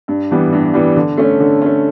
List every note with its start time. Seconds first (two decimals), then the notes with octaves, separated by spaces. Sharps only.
0.08 G2
0.31 E3 G3 B3
0.53 G2
0.74 E3 G3 B3
0.96 D3
1.17 A3 C#4
1.40 D3
1.62 A3 C#4